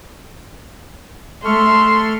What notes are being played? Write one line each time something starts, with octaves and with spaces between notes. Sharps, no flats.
A3 A4 C6 C#6 F6